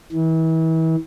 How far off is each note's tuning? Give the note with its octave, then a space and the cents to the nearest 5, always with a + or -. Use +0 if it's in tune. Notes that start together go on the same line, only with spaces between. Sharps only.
E3 -35